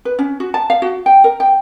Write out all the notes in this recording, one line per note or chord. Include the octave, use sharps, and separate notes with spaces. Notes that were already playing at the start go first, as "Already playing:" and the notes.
B4
C#4
F#4
A5
F5
F#4
G5
A#4
G5